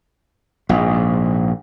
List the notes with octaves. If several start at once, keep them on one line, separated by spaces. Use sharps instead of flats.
A#1 G#2